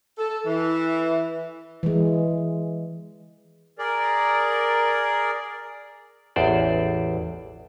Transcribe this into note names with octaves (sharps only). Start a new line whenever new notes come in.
A4
E3
E3 G#3
G#4 A#4 D5
A1 E2 C5 D5